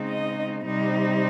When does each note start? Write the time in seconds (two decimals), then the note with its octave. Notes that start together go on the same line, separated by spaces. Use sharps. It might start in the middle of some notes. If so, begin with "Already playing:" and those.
Already playing: C#3 G#3 C4 D#4
0.09 D#5
0.66 C3 G3 C4 D#4